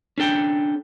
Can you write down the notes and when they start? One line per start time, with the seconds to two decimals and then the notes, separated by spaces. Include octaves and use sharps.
0.18 C#4 D4 A4 G5